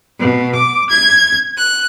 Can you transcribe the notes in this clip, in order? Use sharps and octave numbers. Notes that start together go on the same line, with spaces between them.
B2
D6
G#6
F#6